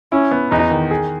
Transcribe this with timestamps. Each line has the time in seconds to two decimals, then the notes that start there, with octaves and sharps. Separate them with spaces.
0.12 C#4 E4
0.31 B3
0.51 E2 D#4
0.71 D#3
0.91 G#4